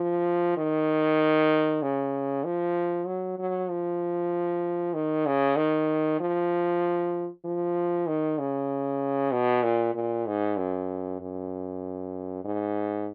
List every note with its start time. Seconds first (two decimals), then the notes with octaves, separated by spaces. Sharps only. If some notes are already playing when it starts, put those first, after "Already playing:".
Already playing: F3
0.57 D#3
1.82 C#3
2.45 F3
3.06 F#3
3.38 F#3
3.70 F3
4.94 D#3
5.26 C#3
5.57 D#3
6.20 F3
7.45 F3
8.07 D#3
8.39 C#3
9.32 B2
9.63 A#2
9.95 A#2
10.27 G#2
10.57 F#2
11.20 F#2
12.44 G#2